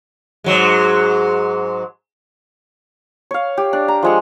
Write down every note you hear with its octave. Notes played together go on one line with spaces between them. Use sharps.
G#2 F#3 G#3
C#5 F5
G4
D4
A#5
F3 G#3 C#6